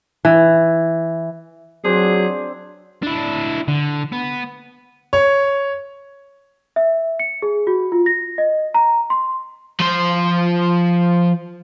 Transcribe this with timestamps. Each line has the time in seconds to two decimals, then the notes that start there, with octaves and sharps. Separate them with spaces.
0.25 E3
1.84 F#3 C4 D4 G#4
3.03 D4 E4
3.68 D3
4.13 B3
5.13 C#5
6.76 E5
7.19 C#7
7.42 G#4
7.67 F#4
7.92 F4
8.06 A#6
8.38 D#5
8.74 A#5
9.10 C6
9.80 F3 C5